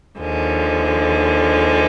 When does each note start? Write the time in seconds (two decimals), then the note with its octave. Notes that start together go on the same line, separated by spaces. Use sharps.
0.18 D#2 D3 F3 G#3